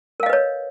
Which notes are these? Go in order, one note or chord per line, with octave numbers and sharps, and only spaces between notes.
A#4 B4 C#5 D#5 F5